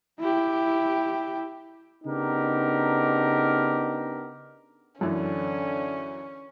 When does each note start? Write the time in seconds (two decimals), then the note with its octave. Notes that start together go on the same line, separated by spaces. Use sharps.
0.20 E4 G4
2.04 C#3 B3 D4 D#4 G4 A#4
5.01 F#2 D3 E3 C#4